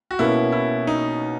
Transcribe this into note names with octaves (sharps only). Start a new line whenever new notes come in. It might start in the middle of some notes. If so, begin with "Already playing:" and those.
F#4
B2 A#3 C#4 E4
E4
D#4